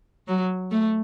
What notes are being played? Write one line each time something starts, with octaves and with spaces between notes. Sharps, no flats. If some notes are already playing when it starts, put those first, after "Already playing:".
F#3
A3